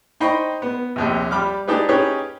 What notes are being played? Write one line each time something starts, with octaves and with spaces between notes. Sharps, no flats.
D#4 C5 D#5 G5 B5 C#6
B3
A#1 D#2 C3
G3 B5 D6 F6
D4 D#4 G4 G#4 B4
C#4 D#4 G4 G#4 B4 C#5